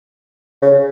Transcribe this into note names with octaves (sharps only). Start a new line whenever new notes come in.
C#3